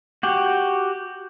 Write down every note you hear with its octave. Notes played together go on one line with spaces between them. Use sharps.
F#4 G4